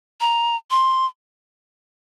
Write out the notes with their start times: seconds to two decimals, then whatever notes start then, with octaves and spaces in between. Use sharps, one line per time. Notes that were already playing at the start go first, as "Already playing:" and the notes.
0.21 A#5
0.71 C6